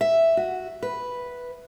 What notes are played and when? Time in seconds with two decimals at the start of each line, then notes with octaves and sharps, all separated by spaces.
0.01 E5
0.37 F#4
0.83 B4